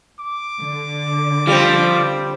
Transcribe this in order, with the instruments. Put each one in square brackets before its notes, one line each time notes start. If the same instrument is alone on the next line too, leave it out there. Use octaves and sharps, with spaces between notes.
[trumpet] D6
[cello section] D3
[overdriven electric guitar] F3 [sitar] G3 C4